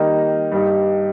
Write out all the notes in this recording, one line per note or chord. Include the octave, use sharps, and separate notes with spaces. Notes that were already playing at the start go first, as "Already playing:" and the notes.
Already playing: D#3 G3 A#3 D#4
G2 G3 D#4